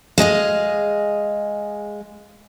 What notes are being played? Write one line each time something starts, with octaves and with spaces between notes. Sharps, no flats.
G#3 G#4 D#5 F5